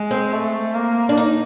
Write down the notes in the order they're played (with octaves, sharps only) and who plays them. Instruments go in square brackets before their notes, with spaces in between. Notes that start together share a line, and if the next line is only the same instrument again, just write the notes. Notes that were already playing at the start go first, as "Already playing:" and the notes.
Already playing: [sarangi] G#3
[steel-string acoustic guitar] C4
[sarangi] A3
A#3
[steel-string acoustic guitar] D4
D#4